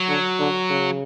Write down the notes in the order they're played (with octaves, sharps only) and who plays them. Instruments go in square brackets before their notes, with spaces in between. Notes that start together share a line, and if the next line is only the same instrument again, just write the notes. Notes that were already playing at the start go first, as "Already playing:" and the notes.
Already playing: [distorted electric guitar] F#3
[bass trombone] D3
D3
C#3